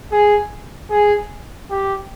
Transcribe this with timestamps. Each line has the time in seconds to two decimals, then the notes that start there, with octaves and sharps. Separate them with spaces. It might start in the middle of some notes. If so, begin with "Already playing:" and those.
0.12 G#4
0.91 G#4
1.70 G4